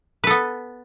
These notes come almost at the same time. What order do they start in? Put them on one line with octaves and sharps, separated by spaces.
B4 A4 B3